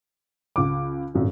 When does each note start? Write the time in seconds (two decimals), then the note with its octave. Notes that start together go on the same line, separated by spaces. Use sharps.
0.56 C#2 D6
1.14 D#1 G#1 F#2